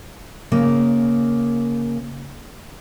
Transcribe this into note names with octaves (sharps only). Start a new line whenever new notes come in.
C#3 A#3